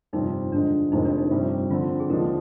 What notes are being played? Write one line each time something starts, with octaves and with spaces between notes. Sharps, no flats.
G1 F2 C3 G3 C4 D#4
F2 D3 G#3 D4
F1 F2 D#3 G#3 D#4
D4
D#4
G1 F2 C3 G3 F4
D3 F3 C4 F4
G#4
D#2 D3 F3 G#3 A#4